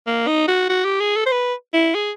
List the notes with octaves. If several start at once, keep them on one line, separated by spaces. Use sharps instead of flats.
A#3
D#4
F#4
F#4
G4
G#4
A4
C5
B4
E4
G#4